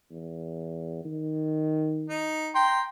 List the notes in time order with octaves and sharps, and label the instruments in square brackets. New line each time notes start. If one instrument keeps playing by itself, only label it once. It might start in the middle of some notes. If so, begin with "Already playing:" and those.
[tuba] E2
D#3
[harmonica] D#4
G5 A#5 C6